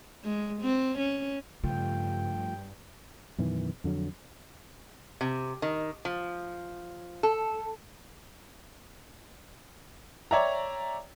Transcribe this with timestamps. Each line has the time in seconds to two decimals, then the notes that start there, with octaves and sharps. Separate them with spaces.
0.24 G#3
0.62 C4
0.98 C#4
1.64 G2 C#3 F3 A3 F4 G5
3.38 F#2 B2 D#3 E3
3.84 F2 D3 F#3
5.21 C3
5.62 D#3
6.05 F3
7.23 A4
10.31 C#5 D5 E5 G5 A#5